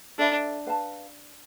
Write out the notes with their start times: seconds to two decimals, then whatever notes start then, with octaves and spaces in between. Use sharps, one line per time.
0.18 D4 A4 E5 B5
0.66 B4 F5 A5